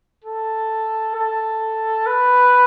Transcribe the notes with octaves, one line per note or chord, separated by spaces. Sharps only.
A4
A4
B4